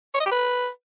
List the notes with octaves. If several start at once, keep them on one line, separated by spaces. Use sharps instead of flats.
C#5
D#5
G4
B4